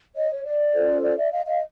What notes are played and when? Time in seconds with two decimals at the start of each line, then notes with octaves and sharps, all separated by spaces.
0.16 C#5 D#5
0.31 C#5
0.45 D5
0.74 C#4 F4 A4 C5
1.03 D5
1.17 D5 E5
1.31 D#5 F5
1.46 D#5 F5